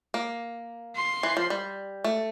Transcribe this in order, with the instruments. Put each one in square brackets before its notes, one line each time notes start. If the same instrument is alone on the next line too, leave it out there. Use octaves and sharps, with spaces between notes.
[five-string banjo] A#3
[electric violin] C6
[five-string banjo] E3
F3
G3
A3